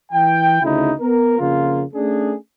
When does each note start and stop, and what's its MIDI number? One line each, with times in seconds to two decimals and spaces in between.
0.12 0.60 52
0.12 0.60 79
0.62 0.91 38
0.62 0.91 49
0.62 0.91 63
0.62 0.91 64
0.99 1.38 59
0.99 1.38 70
1.39 1.82 41
1.39 1.82 49
1.39 1.82 58
1.39 1.82 65
1.94 2.34 57
1.94 2.34 61
1.94 2.34 62
1.94 2.34 68